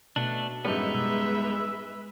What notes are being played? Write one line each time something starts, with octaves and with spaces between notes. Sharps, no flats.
B2 A3 D4
A1 F#2 G3 G#3 B3 D#4 B4 E5
E6